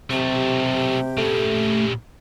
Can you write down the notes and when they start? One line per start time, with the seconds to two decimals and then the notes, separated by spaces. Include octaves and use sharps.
0.11 B1 C3 A3 G4
1.18 A#2 C#3 A3